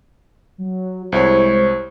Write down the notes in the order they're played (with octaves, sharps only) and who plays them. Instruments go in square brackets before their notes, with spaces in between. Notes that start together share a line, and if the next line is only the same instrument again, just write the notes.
[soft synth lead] F#3
[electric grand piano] C2 E4 C#5 [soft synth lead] G#3 [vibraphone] C5 C#6